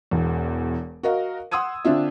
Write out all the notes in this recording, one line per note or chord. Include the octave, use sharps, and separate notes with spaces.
E1 E2
F#4 A#4 D#5 F5
F#5 C6 D#6 E6 G#6 D#7
D3 C4 D4 F4 E5